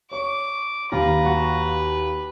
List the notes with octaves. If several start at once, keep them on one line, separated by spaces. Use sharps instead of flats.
C#5 C#6 D6
D#2 F4 B4 A#5
F#4